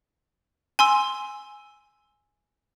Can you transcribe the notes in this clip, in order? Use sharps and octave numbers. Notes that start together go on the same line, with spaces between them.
G#5 C6 E6